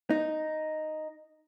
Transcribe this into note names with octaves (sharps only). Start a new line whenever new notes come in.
D#4